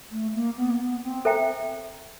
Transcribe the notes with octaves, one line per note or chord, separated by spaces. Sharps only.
A3
A#3
B3
A#3
B3
C4
A4 C5 E5 G5 A#5